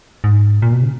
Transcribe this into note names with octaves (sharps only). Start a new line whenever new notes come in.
G#2
A#2
B2
C#3